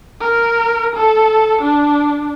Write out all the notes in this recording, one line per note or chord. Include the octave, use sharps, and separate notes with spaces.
A#4
A4
D4